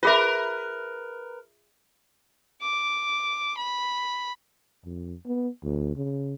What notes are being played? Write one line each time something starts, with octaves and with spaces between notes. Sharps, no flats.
F4 G#4 A#4 B4 E5
D6
B5
F2
B3
D2
C#3